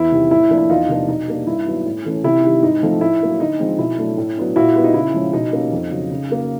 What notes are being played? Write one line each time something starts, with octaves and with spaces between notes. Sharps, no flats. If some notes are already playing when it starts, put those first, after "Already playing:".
Already playing: E2 E4
C3 D#3 G3
A2 E4
F3 A#3 D4
E4
E2 D#4 F4
C3 F3 A#3 D4
B2 D#4
G3 A#3 D4
G2 E4
D#3 F#3 B3 D4
A2
E3 A3 C#4
C3 E4
D#3 G3
G#2 D#4
F3 A3 C4
A2 E4
F#3 A#3 D4
D3 D#4
F3 G#3 C4
B2 E4
F#3 A3 D4
A2
F#3 B3 D4
A#2 E4 F#4
G3 B3
D#4
C#3 E4
F3 G#3 C#4
B2 D#4
G3 A#3 C#4
F2
C#3 F#3
C#3
F#3 A#3